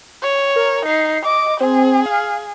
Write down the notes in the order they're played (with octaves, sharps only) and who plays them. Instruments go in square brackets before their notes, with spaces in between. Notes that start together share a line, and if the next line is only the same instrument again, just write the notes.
[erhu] C#5
[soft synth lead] A#4
[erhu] D#4 [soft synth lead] C7
[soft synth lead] D#5 [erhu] D6
[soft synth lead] C4 [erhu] G#4
[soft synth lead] F5